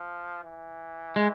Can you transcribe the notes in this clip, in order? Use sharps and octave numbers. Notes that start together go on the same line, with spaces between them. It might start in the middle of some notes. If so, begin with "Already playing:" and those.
Already playing: F3
E3
G#3